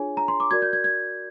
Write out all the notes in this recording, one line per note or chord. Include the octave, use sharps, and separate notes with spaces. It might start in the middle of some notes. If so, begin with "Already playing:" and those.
Already playing: D4 F4 G#4 C#5 G#5
A#5
C6
D6
F#4 A#4 D5 G#6
G6
G#6
G#6